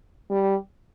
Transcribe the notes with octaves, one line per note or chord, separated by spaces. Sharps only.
G3